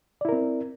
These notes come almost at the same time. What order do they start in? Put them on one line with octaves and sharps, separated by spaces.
D5 E4 A#4 C4